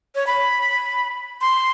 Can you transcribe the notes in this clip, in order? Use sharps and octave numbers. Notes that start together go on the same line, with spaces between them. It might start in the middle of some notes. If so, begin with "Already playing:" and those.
C#5
B5
C6